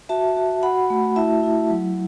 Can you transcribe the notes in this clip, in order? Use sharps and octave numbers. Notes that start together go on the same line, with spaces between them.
F#4 E5 A5
F#4
F#4 F#5 B5
A3
E4 E5 A5
E4
F#3